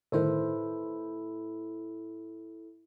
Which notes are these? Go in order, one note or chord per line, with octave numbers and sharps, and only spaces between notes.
G1 A2 D#3 E4 A4 B4 C5